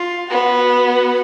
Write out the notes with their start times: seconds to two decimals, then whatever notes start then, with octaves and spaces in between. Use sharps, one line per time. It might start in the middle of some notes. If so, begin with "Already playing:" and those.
Already playing: F4
0.30 B3 F#4